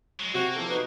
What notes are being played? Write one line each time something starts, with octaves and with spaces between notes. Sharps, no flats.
F#3 G#3
C3 A#3 F#4
E2 F3 A4
D#4 F#4 B4